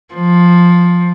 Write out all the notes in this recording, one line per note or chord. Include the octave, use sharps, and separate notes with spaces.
F3